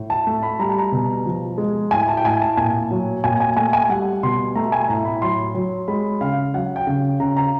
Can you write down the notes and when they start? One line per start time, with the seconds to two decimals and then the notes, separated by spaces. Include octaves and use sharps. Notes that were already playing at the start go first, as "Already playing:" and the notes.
Already playing: A2
0.10 A5
0.27 A3
0.43 B5
0.59 G3 A#5
0.69 A5
0.78 A#5
0.92 B2
1.26 F3
1.58 G#3
1.91 A2 G#5
2.08 A5
2.17 G5
2.24 A2 G#5
2.42 A5
2.57 A#2 G#5
2.91 F#3
3.24 A#2 G#5
3.40 G#5
3.57 A3 G#5
3.73 G#5
3.89 G3 F#5
4.23 B2 C6
4.56 A3 A#5
4.72 G#5
4.88 A2 A#5
5.05 B5
5.22 F#3 C6
5.55 F#3
5.88 G#3 B5
6.21 C#3 F5
6.54 F#3 F#5
6.76 G5
6.87 C#3
7.20 C#3 A#5
7.37 A#5